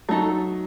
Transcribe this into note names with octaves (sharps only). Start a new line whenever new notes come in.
F#3 A3 D#4 A4